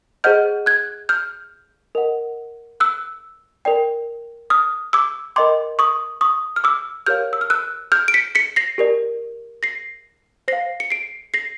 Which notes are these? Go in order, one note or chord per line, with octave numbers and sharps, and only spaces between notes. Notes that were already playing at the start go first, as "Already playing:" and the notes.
G#4 C5 D#5 F#5 F6 G6
F#6 G#6
F6 G6
A#4 D#5 F#5
E6 F#6
A#4 D5 G5
D#6 F6
D6 E6
A#4 D#5 G5 C6 D6
C#6 D#6
C#6 D#6
F6
D6 E6
G4 A#4 C#5 F5 F6 G6
E6
F6
E6 F#6
F6 G6
D7
B6 C#7
B6 C#7
A#6 C7
G4 A#4 D5
A#6 C7
C5 F5 A#6 C7
C#7
C7 D7
A#6 C7